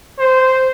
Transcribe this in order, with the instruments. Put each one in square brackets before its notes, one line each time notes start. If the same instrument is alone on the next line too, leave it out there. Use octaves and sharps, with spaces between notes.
[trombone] C5